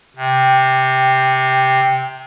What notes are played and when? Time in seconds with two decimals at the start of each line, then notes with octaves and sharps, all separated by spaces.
0.16 C3 G5